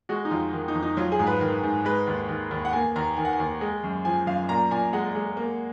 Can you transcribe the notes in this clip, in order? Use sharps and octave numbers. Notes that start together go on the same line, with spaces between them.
G#3 F#4
D#4
F2 F4
D#3
D#4
F2
D#4
F#3 F4
G#4
G#2
B4
D#3
G#2
G#3 B4
D#2
D#3
D#2
F#5
A#3 G#5
D#2 A#5
D#3 G#5
F#5
G#5
D#2
G#3
F#2
F3 G#5
F#2 F5
A#2 A#5
A#2 G#5
G#3 F#5
G#3
A#3